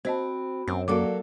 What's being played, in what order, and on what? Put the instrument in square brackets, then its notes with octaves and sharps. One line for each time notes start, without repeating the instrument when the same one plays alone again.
[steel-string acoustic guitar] C4 [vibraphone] F#4 B5 [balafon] C5 D#5 A5
[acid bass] F#2 [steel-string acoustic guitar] C4
[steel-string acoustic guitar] F#3 A#3 A4 [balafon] F#4 D6 [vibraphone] D5 F5